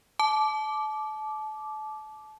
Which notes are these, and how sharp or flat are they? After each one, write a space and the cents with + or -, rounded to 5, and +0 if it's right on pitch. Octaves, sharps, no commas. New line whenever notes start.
A5 -30 D6 +0